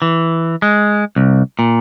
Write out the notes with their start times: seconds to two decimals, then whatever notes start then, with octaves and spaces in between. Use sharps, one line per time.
0.02 E3
0.62 G#3
1.16 C2
1.59 A#2